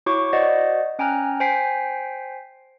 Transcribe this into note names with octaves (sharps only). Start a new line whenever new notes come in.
E4 F#4 C#5 C#6 D6
F#4 C5 D5 D#5 F#5
C#4 G5 G#5 A#5 F6 F#6
C5 G5 G#5 B6 C7